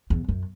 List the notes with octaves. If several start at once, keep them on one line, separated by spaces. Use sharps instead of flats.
E2
F#2